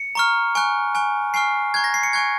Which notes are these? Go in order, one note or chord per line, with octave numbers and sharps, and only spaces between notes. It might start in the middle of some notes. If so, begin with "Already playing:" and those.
Already playing: C#7
A#5 C#6 F6
G#5 C#6 F#6
G#5 C#6 F#6
G#5 C#6 F6 C7
A#5 C#6 F#6 G#6
A#6
C7
C#7
G#5 C#6 F#6 G#6